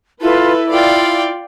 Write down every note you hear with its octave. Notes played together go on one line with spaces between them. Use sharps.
E4 F4 A4 B4
F4 D5 F5 G5